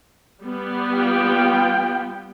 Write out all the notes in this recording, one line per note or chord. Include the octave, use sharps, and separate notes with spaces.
G3 B3
F4 G5